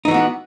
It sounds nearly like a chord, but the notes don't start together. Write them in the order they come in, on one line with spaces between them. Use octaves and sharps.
D#4 E3 F#4 B3